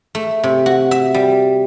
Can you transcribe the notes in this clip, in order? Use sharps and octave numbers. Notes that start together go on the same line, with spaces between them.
A3
C3
F#4
E5
G3